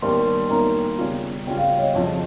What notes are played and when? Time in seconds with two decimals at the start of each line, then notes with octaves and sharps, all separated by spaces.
0.02 D#2 D#3 G3 A#3 C#4 C6
0.50 D#2 D#3 G3 A#3 C#4 A#5
0.98 C#3 G3 C#4 F4
1.47 C#3 G3 C#4 F4 G5
1.58 F5
1.79 C#5
1.82 D#5
1.95 F2 C#3 F3